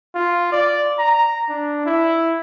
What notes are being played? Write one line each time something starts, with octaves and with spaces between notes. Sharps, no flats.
F4
D5
A#5
D4
E4